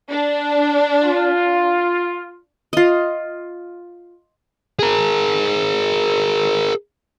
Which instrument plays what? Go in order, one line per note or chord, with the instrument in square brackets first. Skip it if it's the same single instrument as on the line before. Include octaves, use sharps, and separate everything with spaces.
[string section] D4
[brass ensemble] F4
[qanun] F4 D#5
[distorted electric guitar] G#4 A#4